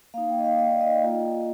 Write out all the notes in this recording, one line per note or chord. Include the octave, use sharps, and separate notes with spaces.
A#3 D#4 F5
G5
D#5
F5
D#5
D5
D#5
G5
A#3 F4